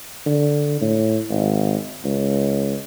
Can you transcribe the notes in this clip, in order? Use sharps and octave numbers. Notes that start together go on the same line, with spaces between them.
D3
A2
G#1
C#2